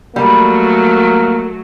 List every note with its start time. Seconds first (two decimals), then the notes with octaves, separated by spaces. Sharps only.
0.16 F#3 G3 A3 A#3